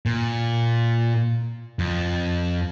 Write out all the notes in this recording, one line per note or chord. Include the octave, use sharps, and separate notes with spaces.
A#2
F2